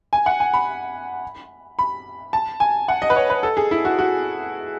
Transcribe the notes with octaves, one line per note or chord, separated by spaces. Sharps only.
G#5
F#5
G#5
B5
B5
A5
G#5
F#5
D#5
B4
C#5
B4
A4
G#4
E4
F#4
F#4